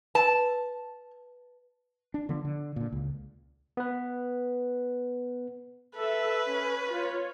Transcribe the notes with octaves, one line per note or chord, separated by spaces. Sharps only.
B4 A5
D4
D3 F3 B3
D3
A#2 D3
C#2
B3 B4
A4 B4 E5
C#4
F4 C#5